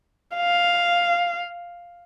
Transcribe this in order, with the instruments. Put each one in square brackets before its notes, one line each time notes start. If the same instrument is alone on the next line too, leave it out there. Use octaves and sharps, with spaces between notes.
[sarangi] F5